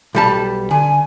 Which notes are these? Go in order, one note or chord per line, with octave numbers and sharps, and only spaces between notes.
B1 G3 A5
D3 G#5